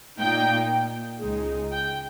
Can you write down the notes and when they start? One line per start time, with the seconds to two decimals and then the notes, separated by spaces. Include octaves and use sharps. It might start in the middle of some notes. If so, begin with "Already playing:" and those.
0.20 A#2 A#3 D#4 G5
1.22 C#2 C#3 G#3 D#4
1.72 G5